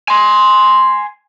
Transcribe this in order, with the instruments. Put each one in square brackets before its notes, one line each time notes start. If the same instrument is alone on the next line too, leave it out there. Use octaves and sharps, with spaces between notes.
[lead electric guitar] G#5 C6